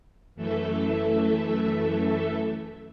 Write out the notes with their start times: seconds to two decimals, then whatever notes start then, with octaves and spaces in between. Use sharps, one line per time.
0.35 F#2 E3 A3 A4 E5